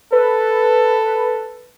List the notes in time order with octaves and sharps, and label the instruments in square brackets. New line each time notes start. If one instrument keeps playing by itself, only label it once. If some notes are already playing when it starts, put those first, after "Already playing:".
[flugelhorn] A4 [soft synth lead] B4